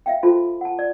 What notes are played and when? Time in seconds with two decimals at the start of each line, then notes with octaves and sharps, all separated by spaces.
0.06 E5 F5 G5
0.23 F4 A4 C5 A5 B5 C6
0.61 F#5 A5
0.79 D5